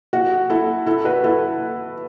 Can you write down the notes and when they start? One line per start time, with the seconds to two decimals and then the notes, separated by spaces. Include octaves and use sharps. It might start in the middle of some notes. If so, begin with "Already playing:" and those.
0.13 F#4
0.50 E4 A4
0.86 E4 A4
1.05 F#4 B4
1.24 E4 A4